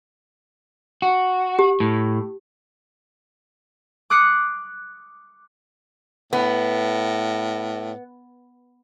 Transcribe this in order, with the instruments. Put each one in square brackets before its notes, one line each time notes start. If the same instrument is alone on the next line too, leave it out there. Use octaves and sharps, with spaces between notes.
[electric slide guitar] F#4
[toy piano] G4
[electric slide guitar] A2
[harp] D6 D#6 F#6 C7 C#7
[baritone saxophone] A2 [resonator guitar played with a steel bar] B3